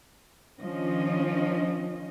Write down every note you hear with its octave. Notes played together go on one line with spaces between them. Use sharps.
D#3 F3 C#4 D4 D#5